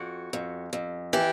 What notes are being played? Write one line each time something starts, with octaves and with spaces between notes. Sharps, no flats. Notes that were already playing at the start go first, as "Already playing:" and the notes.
Already playing: F2 F#4
F2
F2
E3 G4